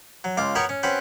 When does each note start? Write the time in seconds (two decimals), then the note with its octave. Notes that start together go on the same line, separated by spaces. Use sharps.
0.24 F#3
0.37 C#2 F4 D6
0.55 B3 F#4 A#4 C#5 G5
0.69 C#4
0.83 C4 C#4 F#4 B4 G5